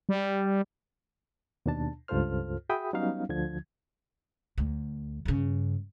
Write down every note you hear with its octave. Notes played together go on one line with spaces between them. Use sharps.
G3
D#2 B2 D4 A5
C#2 G2 F4 A4 C5 F6
F#4 G#4 E5 G5 B5 D#6
F#3 G3 B3 C#4 D#4 F5
D2 D3 F3 G#6
D2
G2 C#3